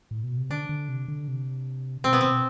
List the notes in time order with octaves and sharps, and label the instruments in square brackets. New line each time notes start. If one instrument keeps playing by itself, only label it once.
[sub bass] A2
B2
C3
[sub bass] D3 [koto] D4
[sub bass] D3
C3
D3
C3
[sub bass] B2 [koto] C4
[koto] B3
[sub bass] B2 [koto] C4